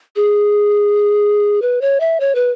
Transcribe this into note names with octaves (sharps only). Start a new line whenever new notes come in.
G#4
B4
C#5
E5
C#5
B4